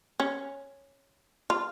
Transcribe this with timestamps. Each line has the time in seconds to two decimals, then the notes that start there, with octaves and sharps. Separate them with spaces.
0.20 C#4
1.50 F4